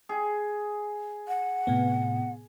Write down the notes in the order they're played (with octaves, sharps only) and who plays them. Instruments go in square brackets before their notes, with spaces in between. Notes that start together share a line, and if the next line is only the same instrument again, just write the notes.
[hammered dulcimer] G#4
[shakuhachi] F#5
[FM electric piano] A2 C3 B3